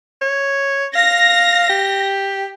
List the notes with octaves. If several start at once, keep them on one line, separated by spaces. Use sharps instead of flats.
C#5
F5 A#6
G4